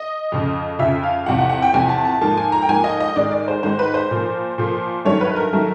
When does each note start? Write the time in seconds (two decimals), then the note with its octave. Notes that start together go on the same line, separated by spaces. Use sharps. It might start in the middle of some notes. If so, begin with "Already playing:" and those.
Already playing: D#5
0.32 F2 C#3 F3
0.79 F2 C#3 F3 E5
1.03 F5
1.26 E2 C3 F3 F#5
1.38 F#5
1.49 F#5
1.62 G5
1.73 E2 C3 F3 G#5
1.89 A5
2.05 A5
2.21 G#2 F3 A#3 A5
2.37 G#5
2.52 A#5
2.62 G5
2.68 G#2 F3 A#3 G#5
2.84 D#5
3.00 D#5
3.16 G#2 D#3 G#3 D5
3.31 D5
3.48 C5
3.63 G#2 D#3 G#3 C5
3.79 B4
3.94 C5
4.11 A#2 F3 A#3
4.58 A#2 F3 A#3
5.05 G2 D#3 F#3 A3 C#5
5.21 B4
5.36 A#4
5.53 D#3 F#3 A3